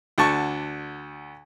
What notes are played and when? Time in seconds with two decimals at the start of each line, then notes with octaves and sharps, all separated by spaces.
0.18 D2 D3 A5 C#6